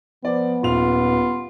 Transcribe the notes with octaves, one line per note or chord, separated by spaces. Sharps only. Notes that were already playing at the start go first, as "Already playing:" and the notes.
F3 B3 D5
D#1 F4 F7